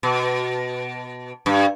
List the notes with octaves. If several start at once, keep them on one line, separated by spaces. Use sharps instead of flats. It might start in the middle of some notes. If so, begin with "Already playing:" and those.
B2
G2